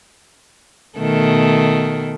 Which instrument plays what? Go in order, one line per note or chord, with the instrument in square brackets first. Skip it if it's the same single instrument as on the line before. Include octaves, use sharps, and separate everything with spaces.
[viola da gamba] B2 D#3 A3